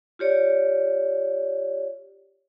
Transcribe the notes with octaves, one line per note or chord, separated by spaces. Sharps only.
F4 G4 C#5 D5